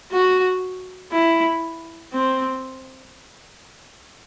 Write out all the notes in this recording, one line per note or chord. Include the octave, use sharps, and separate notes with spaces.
F#4
E4
C4